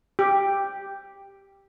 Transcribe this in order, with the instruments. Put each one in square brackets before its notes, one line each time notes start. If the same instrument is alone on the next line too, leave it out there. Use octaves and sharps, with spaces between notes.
[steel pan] G4